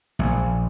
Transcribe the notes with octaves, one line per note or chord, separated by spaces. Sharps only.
A#1